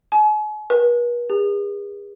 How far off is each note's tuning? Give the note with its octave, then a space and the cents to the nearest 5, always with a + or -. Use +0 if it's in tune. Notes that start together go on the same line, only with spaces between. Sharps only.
G#5 +40
B4 -45
G#4 -45